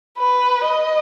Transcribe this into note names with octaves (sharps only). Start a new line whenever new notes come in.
B4
D#5